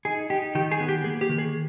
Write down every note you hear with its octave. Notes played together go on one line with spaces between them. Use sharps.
D#4 G#4
D#4 G4
D#3 G4
G#4
B3
G4
A#3 G#4
G4
D#3
G#4